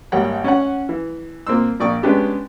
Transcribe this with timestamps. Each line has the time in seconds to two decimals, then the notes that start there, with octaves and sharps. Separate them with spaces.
0.12 G#1 G3 A#3 C#5 F#5 G5
0.44 C#4 C#5 F#5
0.89 E3
1.47 A#2 A#3 C4 C6 E6
1.80 A#1 A#3 D5 G5 C#6 D#6
2.03 G#3 B3 C#4 D4 G4